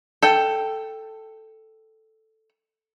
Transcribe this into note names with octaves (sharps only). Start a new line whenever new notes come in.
A4 G5